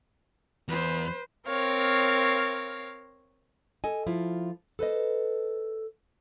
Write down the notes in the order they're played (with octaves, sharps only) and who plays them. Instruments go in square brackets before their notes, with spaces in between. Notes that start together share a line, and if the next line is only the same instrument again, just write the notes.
[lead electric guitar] E2 [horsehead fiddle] B4 C5
[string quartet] C4 A#4 C#5 F5
[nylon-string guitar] A4 D#5 G#5
F3 E4 F4
A4 B4 C5 D#5